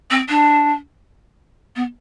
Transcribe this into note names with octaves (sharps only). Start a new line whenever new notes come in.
C4
D4
B3